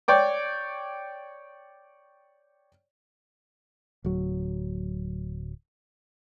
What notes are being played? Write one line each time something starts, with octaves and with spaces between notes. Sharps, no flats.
C#5 D5 G5 D6
D1 F#3